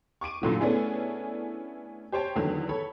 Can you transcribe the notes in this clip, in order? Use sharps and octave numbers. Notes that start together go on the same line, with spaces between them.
C#6 D6 D7 D#7
F#2 A#2 D3 E3
A3 B3 C#4 D4 E4 G#4
G4 C5 C#5 G5 A5
E2 D3 D#3 F#3
A4 C#5 B5